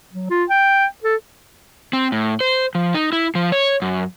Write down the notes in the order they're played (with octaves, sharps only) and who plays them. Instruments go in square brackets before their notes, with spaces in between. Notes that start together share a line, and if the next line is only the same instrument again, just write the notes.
[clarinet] F#3
F4
G5
A4
[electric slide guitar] C4
A2
C5
F3
D#4
E4
F3
C#5
F#2